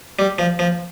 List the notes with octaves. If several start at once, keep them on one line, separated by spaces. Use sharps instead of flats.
G3
F3
F3